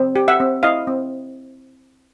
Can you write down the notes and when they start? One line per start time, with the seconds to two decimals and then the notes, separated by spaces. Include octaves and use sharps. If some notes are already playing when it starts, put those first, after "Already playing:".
Already playing: C4
0.16 G4
0.28 E5 F#5
0.40 C4
0.63 E4 D#5 F5
0.87 C4